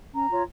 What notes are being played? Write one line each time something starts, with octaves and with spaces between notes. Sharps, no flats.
C#4 A#5
F4 C#5